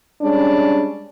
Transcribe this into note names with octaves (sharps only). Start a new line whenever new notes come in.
G3 G#3 C#4 D4